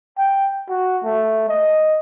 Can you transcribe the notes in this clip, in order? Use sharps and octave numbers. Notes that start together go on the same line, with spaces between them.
G5
F#4
A3
D#5